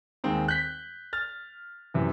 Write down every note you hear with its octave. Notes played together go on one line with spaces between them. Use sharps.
D#2 G#3 A#3 C4 D#4
F#6 G6 B6
F6 A6
F#2 C3 E3